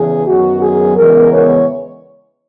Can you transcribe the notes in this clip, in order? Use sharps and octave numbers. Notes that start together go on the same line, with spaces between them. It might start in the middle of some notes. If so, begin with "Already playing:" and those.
Already playing: E2 C#3 E3 G#4
F#2 D#3 F#3 B3 F#4
G#4
E2 C#3 E3 G#3 B3 A#4
C#5